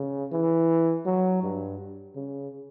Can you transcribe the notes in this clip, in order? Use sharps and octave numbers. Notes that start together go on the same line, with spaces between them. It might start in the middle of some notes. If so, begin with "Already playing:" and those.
Already playing: C#3
E3
F#3
G2
C#3